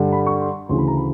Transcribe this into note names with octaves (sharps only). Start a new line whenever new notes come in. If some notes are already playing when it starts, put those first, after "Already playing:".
Already playing: G2 D3 G3
B5
C#6
C6
D2 C#3 E3 C6
B5
A#5
B5